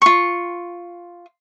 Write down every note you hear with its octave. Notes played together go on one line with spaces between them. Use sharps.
F4 C#6